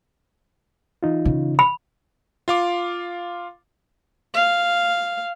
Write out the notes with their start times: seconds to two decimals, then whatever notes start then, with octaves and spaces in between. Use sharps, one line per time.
1.03 E3 D#4 F4
1.25 C#3
1.59 B5
2.48 F4 F5 D6
4.34 F5